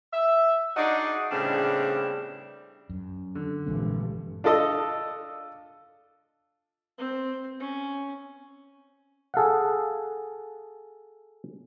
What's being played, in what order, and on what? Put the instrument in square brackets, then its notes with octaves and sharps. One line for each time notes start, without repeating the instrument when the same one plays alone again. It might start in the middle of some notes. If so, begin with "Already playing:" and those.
[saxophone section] E5
D4 D#4 F#4 G#4 D5 D#5
A2 C#3 G3 B3 C4 D4
[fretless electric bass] F#2
[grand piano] D3
[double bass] A#1 G2 [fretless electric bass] E3 G#3 C4
[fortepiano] D4 F4 A4 D#5
[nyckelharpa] C4
C#4
[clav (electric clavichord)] G#4 A4 F5 F#5